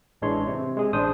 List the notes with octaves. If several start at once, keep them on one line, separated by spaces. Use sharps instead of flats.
A1 E3 G#3 D4 C#5 C6
C3
G#3 G#4
A1 D4 C5 D#6